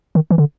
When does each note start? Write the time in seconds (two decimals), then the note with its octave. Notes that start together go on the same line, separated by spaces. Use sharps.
0.15 D#3
0.31 E3
0.38 D3